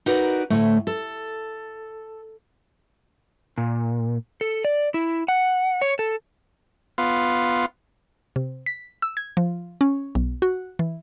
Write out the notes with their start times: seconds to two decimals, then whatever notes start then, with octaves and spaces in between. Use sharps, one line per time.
0.06 D#4 F#4 A#4 B4 D5
0.50 D2 A2 A3
0.87 A4
3.58 A#2
4.41 A4
4.65 D5
4.94 E4
5.28 F#5
5.81 C#5
5.99 A4
6.98 B3 F4
8.36 C3
8.66 B6
9.02 E6
9.17 G#6
9.37 F3
9.81 C#4
10.15 B1
10.42 F#4
10.79 E3